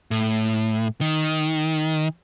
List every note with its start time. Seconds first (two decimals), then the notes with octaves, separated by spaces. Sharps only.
0.11 A2
1.01 D#3